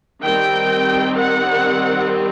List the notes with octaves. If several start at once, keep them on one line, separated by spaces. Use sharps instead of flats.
D#3 G3 C4 G5
F#5